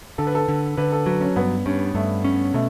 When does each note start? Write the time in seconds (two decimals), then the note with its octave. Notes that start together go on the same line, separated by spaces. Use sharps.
0.18 D3 A4
0.27 B4
0.35 A4
0.48 D3
0.77 D3 B4
0.92 A4
1.06 F#3 B4
1.21 C#4
1.36 G2 B3
1.66 G2 C#4
1.95 G2 A3
2.24 C#4
2.54 B2 A3